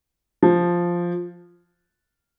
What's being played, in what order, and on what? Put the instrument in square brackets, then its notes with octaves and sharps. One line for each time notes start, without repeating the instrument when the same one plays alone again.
[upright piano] F3